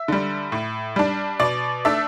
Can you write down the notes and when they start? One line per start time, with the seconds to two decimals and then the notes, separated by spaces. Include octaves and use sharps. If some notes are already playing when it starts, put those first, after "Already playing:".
Already playing: E5
0.08 D3 G3
0.52 A2
0.96 G3 D4
1.40 B2 D5
1.85 A3 D4 E5